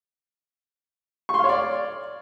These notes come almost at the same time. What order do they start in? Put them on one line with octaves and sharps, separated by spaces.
C#6 C6 F5 C#5 D5